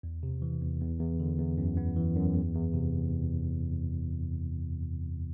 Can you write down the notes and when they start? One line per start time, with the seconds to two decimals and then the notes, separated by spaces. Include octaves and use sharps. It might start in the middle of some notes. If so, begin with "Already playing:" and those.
0.03 E2
0.23 C3
0.42 E3
0.61 E2
0.81 E2
1.00 E2
1.20 D3
1.39 E2
1.58 F#2
1.77 B3
1.97 E3
2.16 F#2
2.35 E2
2.55 E2
2.74 C3